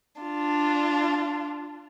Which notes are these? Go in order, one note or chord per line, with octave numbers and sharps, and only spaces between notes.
D4 F4